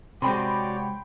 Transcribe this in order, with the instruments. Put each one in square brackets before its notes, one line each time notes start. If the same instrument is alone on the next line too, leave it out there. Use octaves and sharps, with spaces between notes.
[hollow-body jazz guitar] C3 G#3 [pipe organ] F#4 C#5 D5 [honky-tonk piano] G5 B5 C6